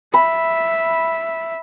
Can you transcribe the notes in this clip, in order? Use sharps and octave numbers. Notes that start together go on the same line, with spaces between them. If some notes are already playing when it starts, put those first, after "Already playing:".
E5 B5